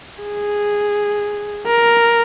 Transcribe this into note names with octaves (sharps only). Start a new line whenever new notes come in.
G#4
A#4